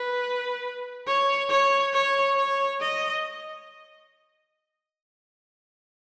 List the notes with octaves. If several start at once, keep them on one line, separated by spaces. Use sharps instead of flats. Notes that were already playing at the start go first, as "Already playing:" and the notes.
Already playing: B4
C#5
C#5
C#5
C#5
D#5